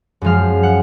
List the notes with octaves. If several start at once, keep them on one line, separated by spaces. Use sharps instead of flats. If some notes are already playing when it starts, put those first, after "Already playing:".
F#2 F3 G#3 F5
F#5